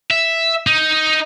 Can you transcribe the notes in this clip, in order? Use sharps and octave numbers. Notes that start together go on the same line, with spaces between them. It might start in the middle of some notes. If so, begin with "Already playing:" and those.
E5
D#4